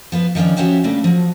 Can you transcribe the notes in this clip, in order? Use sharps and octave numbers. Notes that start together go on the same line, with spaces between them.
F3 B3 B4
D#3 F3 A3 C#4 D4
F3 C#4 F#4 G4 E5
C#3 G3 A3 A#3 D4
F3 F#3